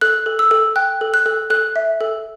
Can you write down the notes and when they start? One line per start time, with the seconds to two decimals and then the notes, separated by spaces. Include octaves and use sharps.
0.01 A4 F#6
0.26 A4
0.39 E6
0.51 A4
0.76 G5 F#6
1.01 A4
1.14 F#6
1.26 A4
1.50 A4 F#6
1.76 E5
2.01 A4